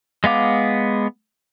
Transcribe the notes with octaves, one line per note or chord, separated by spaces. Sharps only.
G#3 B3 F5 D6